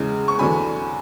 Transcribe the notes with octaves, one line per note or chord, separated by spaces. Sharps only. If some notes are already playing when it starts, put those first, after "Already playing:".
Already playing: E2 C#3 G#3
C#6
E2 D3 F#3 G#5 B5